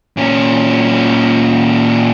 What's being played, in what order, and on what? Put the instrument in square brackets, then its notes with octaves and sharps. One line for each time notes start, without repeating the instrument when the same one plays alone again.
[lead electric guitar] A#2 C#4